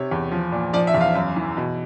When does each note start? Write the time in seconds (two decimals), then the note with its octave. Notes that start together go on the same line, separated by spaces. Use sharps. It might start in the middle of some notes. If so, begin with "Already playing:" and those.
Already playing: C3 C#5
0.11 E2
0.31 F3
0.52 A#2
0.73 F3 D5
0.87 E5
0.94 E2
1.01 F5
1.16 F#2
1.36 E3
1.57 B2